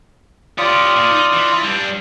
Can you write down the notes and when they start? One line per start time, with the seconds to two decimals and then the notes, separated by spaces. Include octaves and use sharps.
0.58 F4 G4 C#5 D5 D#6
0.96 A#2
1.10 D#4
1.33 E3
1.63 G3 D4